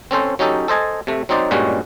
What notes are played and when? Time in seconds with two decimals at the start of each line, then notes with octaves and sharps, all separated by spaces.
0.11 C4 C#4 A4 C5
0.39 F#3 C#4 D#4 G4 A4
0.68 A4 C5 D#5 G#5 A5
1.07 C3 A3
1.29 F#3 C4 D#4 C5 D5
1.51 G2 A#2 G3 G#3 C#4 F#4